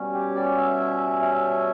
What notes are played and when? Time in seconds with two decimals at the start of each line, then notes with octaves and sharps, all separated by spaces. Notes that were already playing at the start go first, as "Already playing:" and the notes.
Already playing: B2 G3 C#4
0.13 G4
0.35 D5
0.57 E5
1.22 E5